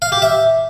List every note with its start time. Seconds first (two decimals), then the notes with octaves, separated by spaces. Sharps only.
0.02 F5
0.12 G4
0.22 E5